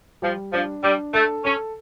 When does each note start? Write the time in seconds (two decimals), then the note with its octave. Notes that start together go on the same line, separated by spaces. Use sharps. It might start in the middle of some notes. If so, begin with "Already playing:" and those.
0.22 F3 G3
0.52 F3 D4
0.83 G3 D4
1.14 A3 A4
1.44 C#4 A4